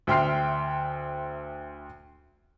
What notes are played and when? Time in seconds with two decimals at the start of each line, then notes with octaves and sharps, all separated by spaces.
0.07 D2 E5 G5 C6 F6 C7